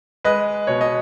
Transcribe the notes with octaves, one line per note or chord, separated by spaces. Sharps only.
G#3 B4 D#5
B2 C#5
D#5